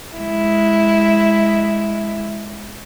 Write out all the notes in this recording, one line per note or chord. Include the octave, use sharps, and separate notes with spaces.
G#3 E4